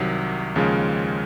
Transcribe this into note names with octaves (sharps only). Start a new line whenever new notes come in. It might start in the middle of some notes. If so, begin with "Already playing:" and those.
Already playing: C2 C3 D#3 F#3
D#2 C#3 F3 G#3